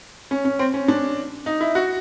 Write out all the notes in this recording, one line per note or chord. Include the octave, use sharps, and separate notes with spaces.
C#4
C#4
C4
C#4
D4
D#4
E4
F#4